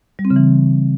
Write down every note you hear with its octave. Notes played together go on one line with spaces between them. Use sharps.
G3
C4
C#3
E3